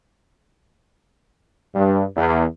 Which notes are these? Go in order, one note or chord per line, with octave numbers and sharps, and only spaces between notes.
G2
E2